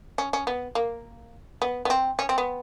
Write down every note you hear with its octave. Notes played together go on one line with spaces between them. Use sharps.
C#4
C#4
B3
A#3
B3
B3
C4
C#4
C4
B3